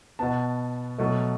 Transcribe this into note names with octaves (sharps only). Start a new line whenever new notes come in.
B2 B3 A5
B2 F#3 A3